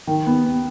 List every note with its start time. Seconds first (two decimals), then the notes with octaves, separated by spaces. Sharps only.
0.07 D#3
0.27 B3
0.44 B3